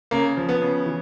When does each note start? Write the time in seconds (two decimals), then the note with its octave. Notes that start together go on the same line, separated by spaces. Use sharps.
0.11 C#3 A#3
0.37 F3
0.49 B3
0.61 C#3
0.86 E3